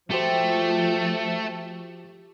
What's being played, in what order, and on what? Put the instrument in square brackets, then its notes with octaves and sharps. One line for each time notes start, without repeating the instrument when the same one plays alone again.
[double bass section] F3 [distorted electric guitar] A3 [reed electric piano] F#4 C5 [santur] G4